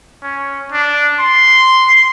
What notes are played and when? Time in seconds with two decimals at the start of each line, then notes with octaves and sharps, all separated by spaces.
0.23 C#4
0.72 D4
1.19 C6